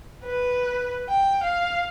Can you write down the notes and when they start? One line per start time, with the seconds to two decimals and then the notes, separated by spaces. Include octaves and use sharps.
0.24 B4
1.09 G5
1.43 F5